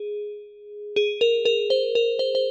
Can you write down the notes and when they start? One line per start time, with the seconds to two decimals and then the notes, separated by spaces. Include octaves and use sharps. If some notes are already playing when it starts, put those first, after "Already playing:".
Already playing: G#4
0.96 G#4
1.21 A#4
1.45 A#4
1.70 C5
1.95 A#4
2.19 C5
2.35 C5